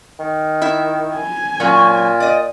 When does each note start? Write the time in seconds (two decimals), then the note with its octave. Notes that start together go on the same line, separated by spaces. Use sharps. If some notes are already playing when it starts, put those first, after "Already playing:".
0.19 D#3
0.62 E4 E5
1.16 G#5
1.60 A#2 F#3 C#4
2.20 D5 D#5